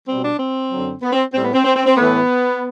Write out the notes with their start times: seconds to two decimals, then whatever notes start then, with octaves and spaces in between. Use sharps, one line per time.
0.07 B2 G3 C4
0.24 D4
0.39 C4
0.71 F#2 D3 F#3
1.02 B3
1.13 C4
1.33 A2 G3 C4
1.44 B3
1.54 C4
1.64 C4
1.76 C4
1.86 C4
1.96 A2 E3 A3 B3